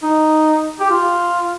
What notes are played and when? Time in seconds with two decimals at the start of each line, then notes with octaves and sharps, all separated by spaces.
0.03 D#4
0.80 G4
0.90 F4